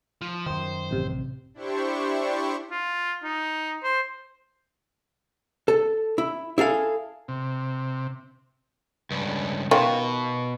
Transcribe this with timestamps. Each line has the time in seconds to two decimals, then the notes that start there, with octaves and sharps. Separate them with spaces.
0.21 F3
0.46 F#2 D#3 C5
0.91 A1 C3
1.54 D4 E4 G4 C5 C#6
2.71 F4
3.23 D#4
3.84 C5
5.68 A4
6.18 E4
6.58 E4 G#4 A4 F5
7.28 C3
9.11 C#2 G2
9.71 B2 D#3 F4 C#5